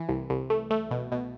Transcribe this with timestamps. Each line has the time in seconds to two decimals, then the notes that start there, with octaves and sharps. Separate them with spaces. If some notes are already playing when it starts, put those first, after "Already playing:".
Already playing: E3
0.09 C2
0.30 C2
0.50 A3
0.70 A3
0.91 B2
1.12 B2